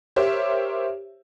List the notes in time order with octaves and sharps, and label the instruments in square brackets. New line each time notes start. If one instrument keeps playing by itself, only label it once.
[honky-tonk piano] G4 A#4 C5 C#5 E5